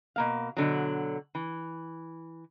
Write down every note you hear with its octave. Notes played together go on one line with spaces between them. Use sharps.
B2 A#3 F5
B2 D3 F#3
E3